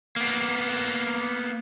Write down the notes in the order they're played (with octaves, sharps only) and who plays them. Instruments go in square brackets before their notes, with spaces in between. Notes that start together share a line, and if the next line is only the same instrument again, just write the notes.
[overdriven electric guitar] A#3 B3